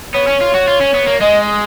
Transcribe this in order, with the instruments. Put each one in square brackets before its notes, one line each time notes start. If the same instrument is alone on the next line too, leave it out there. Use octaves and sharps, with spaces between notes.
[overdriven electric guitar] B3 [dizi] C#5
[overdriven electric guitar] C#4
F4
F#4
F4
C#4
B3
A#3
[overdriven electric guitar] G#3 [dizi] D#5